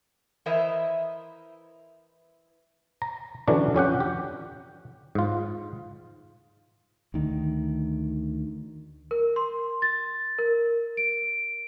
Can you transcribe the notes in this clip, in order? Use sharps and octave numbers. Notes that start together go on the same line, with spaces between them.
E3 E4 A#4 C5 D#5 E5
A#5
D3 E3 F#3 C#4 D4
F2 C#4 G4 F#5
G4
G#2 F4
D2 D#3
A#4
C6
A6
A#4
D7